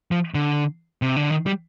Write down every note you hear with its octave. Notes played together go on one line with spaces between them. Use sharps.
F3
D3
C3
D3
D#3
G3